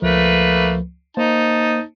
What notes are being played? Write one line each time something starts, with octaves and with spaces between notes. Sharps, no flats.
C#2 F3 A3 A#3 B4
A#3 D#4 C5 A5